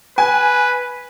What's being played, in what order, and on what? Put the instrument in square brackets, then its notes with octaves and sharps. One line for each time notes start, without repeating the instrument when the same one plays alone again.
[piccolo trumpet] B4 [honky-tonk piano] G#5